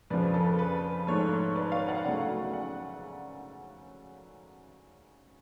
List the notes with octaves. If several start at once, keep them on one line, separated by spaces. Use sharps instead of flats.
F2 C#3 F3 B4 D5
A4
B4
B4
G#2 F3 A3 A4 C#5
B4 D5
C#5 F5
D5 F#5
C#3 F#3 A3 D5 F#5
D5 F#5